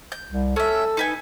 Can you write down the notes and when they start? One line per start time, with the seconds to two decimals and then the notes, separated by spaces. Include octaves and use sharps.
0.12 G6
0.29 C2
0.56 C#4 A4 E5
0.97 D#4 B4 G#5